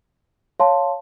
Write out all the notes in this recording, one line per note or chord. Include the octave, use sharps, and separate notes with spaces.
C#5 F5 A5 C6